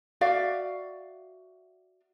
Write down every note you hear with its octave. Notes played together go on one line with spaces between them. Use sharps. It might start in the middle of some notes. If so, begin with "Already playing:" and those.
F#4 D5 E5 F5